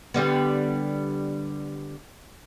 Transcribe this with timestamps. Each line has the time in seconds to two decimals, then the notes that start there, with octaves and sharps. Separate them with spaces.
0.14 D3 G3 B3